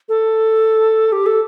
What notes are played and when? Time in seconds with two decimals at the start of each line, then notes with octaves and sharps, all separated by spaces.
0.09 A4
1.12 G4
1.26 A4